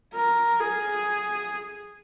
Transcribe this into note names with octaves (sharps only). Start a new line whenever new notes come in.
A#4
G#4